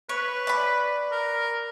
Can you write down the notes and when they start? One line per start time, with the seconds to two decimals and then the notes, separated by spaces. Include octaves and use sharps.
0.09 B4 C#5
0.47 D5 B5
1.12 A#4